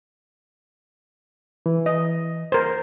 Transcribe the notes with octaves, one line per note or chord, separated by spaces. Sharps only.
E3
D#5
A#4 C5